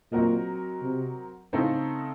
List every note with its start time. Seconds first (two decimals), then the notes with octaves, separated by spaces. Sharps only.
0.12 A#2 F#3 C4 F#4 A#4 D#5
0.82 C3
1.53 A2 C#3 A3 C4 D#4 A4